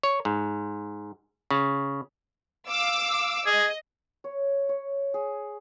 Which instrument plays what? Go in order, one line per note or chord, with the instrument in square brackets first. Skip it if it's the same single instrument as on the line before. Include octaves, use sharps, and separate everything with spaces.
[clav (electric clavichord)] C#5
G#2
C#3
[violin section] F5 D6 E6
[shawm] G#4 [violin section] D#5
[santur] C#5
C#5
G#4